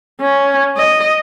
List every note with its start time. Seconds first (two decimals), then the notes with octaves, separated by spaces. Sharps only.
0.21 C#4
0.77 D#5